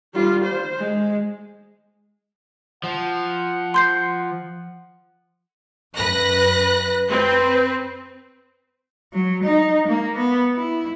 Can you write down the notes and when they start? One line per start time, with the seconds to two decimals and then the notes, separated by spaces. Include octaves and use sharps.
0.15 G3 F4
0.45 C5
0.79 G#3
2.84 F3 F#5
3.74 C6 G6 C7
5.96 F#2 B4 F#6 A#6
7.08 C4 B4
9.13 F#3
9.44 D#4
9.88 A#3
10.18 B3
10.57 E4